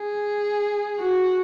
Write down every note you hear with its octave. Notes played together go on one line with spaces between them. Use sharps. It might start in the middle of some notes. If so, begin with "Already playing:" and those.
Already playing: G#4
F#4